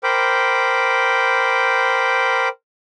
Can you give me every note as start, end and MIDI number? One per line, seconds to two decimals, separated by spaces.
0.03 2.48 70
0.03 2.48 72
0.03 2.48 79
0.03 2.48 83
0.03 2.48 86